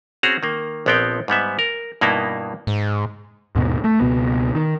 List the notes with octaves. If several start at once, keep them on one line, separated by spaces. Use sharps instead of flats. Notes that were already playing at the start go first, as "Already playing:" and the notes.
C4 C#4 F#4 G#4 A#5
D#3 A#3
A#1 F3 B3 C4 G5
G#2 G3 B3 E5
A#4
G2 B2 A#3 B3 D#4 E4
G#2
D#2 G#2 B2
A3
C#2 G#2 B2 B3
D#3